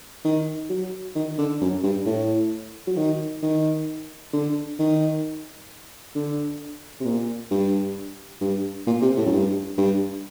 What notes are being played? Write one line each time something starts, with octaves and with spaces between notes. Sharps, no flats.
D#3
F#3
D#3
D3
F#2
G2
A2
F#3
D#3
D#3
D3
D#3
D3
C3
A#2
G2
G2
A#2
C3
A2
F#2
G2
G2